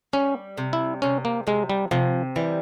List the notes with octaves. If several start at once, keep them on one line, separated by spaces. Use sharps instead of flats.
G3 C#4
C3
E4
C3 C#4
A#3
C3 G#3
G3
C3 F3
E3 G3